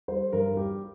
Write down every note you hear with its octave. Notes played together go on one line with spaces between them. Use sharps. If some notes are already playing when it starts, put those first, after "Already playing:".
G3 C5
G2 A#4
G3 G4